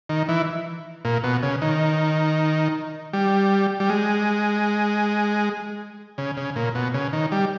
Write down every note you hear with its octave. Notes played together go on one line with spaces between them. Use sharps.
D#3
E3
A#2
B2
C#3
D#3
G3
G3
G#3
C#3
C#3
A#2
B2
C#3
D#3
G3